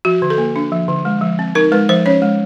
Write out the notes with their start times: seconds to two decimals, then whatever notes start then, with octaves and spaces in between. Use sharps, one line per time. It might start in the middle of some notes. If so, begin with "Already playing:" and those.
0.05 F3 F#4
0.22 D3
0.30 A4
0.38 A#3
0.56 D4
0.72 F3
0.88 D3
1.05 G#3
1.21 F3
1.39 C4
1.55 D#4 A#4
1.72 G#3 B4
1.89 F3 C5
2.06 C#4 C#5
2.22 G#3